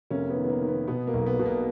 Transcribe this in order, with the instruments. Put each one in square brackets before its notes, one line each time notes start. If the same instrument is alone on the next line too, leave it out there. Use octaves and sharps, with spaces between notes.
[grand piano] F1 A#3 C#4
B3
D#3
B3
A#3
D#3
B3
B2 B3
A#3
B1
B3
B2
A#3